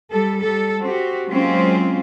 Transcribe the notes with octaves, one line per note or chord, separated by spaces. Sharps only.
G3 A4
G3 A4
C4 F#4 G4
F#3 G#3 A#3 C4 C#4 F4